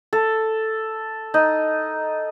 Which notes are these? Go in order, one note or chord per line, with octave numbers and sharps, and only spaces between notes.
A4
D#4